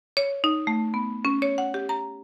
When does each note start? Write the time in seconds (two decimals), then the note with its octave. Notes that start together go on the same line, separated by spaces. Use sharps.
0.17 C#5
0.44 D#4
0.67 A3
0.94 B3
1.25 C#4
1.42 C#5
1.58 F#5
1.74 G4
1.89 A#5